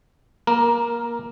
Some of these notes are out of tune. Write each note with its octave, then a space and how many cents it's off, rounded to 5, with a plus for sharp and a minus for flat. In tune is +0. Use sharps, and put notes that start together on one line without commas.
A#3 +15 A#4 +0